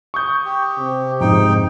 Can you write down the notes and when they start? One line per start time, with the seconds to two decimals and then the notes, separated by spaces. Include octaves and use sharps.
0.14 C#6 D#6 G6
0.45 G4
0.78 C3
1.21 F2 G#2 D#4 G5